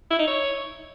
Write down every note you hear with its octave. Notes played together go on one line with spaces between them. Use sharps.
E4
D#4
C#5